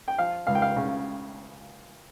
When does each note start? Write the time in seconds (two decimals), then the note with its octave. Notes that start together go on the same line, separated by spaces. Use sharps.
0.08 G5
0.18 F3 F5
0.47 C#2 F5
0.55 G5
0.62 F5
0.76 C#3